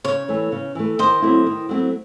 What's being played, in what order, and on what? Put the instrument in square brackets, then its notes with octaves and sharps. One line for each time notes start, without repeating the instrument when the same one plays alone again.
[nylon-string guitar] C#3 [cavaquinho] C#5
[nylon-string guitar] E3 A3
C#3
E3 A3
[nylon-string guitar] D#3 [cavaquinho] C5 D#5
[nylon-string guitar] F#3 A3 C4 E4
D#3
F#3 A3 C4 E4